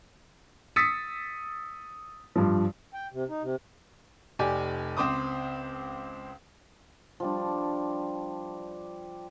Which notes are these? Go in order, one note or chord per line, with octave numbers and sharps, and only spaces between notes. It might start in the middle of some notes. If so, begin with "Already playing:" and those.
D#6 E6 A6 B6 C#7
G2 F3
G5
C3
D#4
C3
F1 G4 D5 G#5
C#2 C4 C5 D6 D#6
F3 G3 D4